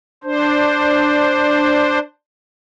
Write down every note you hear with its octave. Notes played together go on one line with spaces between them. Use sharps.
D4 C5